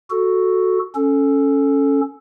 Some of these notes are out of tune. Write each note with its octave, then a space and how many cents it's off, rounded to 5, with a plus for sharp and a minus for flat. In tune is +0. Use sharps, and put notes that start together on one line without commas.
F#4 +0 A4 +0
C#4 +0 A4 +0